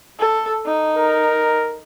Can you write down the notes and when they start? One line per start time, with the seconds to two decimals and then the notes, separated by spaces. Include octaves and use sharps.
0.20 A4
0.66 D#4
0.97 A#4